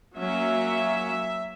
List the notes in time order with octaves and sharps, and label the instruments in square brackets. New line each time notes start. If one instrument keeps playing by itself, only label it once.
[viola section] F#3 A#3 C#4 E5